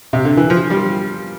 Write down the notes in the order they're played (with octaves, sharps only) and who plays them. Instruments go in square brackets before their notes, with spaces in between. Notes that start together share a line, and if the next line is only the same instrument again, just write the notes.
[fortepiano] C3
D3
E3
F3
G3